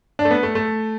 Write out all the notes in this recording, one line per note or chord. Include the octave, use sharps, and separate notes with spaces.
D4
A3
B3
A3
A3